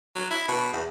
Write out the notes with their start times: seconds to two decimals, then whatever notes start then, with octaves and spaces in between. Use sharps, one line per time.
0.15 F#3
0.31 E4
0.48 B2
0.73 E2